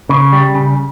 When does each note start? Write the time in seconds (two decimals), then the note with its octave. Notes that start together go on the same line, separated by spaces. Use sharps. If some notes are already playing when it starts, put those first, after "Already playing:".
0.09 C#3
0.33 G3
0.55 C#3